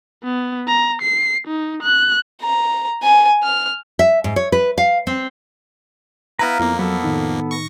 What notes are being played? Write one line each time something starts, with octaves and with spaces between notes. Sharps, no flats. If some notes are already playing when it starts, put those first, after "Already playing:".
B3
A#5
C7
D#4
F#6
A#5
G#5
F6
E5
G#2
C#5
B4
F5
C4
B3 E4 B4 F5 A#5
F2 A#3 B3 E4
F#3 B3 A4
A2 D#3 D#4
C#6 A#6